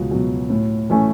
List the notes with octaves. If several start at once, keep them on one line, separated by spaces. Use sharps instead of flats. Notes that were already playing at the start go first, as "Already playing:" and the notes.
Already playing: C#2 B2 F#3
B2 F#3
A2
E3 A3 C#4